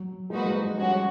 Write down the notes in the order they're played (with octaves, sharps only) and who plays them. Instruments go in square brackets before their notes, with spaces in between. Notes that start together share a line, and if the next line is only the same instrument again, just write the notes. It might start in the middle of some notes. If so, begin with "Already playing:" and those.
Already playing: [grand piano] F#3
[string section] F3 A#3 D#4 F#4 B4 [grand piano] G#3
[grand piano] G#3
A3
G#3
[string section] F3 G#3 C#4 F#4 [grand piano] G3